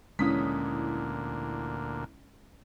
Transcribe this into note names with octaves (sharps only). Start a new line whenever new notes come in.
D2 A#2 E3 G#3 C#4 D#6 B6